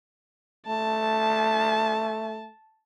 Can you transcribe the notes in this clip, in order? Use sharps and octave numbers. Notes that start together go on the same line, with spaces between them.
A3 A5